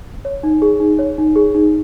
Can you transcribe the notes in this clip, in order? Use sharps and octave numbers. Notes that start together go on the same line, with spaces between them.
C#5
D#4
G#4
D#4
C#5
D#4
G#4
D#4